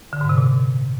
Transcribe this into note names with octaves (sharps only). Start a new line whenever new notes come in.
D3
G#2
C3
A#2